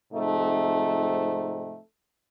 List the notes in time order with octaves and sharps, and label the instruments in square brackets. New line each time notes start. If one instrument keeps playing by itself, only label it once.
[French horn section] G#2 C3 F3 A3 C4 D#4